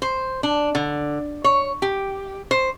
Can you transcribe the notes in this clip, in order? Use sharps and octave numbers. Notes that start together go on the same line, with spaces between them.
C5
D4
D3
C#5
G4
C5